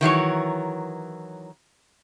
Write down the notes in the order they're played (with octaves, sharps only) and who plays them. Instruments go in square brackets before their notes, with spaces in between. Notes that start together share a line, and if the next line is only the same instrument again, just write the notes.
[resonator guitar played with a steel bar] D#3 E3 F#3 C#5